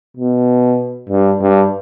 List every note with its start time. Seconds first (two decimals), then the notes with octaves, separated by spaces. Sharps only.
0.17 B2
1.10 G2
1.41 G2